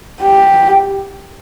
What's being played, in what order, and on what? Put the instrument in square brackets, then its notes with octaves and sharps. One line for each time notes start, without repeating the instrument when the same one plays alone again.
[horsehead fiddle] G4